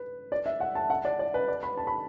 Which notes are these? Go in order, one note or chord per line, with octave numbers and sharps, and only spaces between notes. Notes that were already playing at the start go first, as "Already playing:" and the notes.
Already playing: B4
D5
E5
F#5
A5
F#5
D5
D5
B4
D5
B5
A5
B5